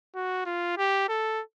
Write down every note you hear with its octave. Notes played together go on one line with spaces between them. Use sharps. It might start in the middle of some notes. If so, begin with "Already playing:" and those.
F#4
F4
G4
A4